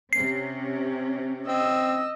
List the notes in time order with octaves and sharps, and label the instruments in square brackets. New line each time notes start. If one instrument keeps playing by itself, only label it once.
[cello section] C3 C#4 [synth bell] C7
[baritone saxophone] C4 [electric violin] D#5 E6